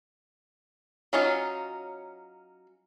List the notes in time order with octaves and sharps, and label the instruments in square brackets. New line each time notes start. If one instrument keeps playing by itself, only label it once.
[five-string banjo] F#3 C#4 D#4 F4